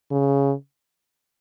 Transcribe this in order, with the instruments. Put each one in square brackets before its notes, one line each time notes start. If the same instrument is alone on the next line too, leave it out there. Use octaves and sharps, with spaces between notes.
[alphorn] C#3